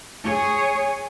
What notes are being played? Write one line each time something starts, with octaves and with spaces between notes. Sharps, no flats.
G#4 C#5